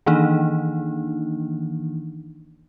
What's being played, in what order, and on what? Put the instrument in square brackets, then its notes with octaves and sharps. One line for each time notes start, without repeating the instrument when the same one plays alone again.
[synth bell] D#3 E3 A#3 D4 D#4